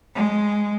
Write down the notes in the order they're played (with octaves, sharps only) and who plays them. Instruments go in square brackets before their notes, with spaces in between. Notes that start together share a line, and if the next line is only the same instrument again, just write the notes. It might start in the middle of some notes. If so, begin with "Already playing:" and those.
[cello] G#3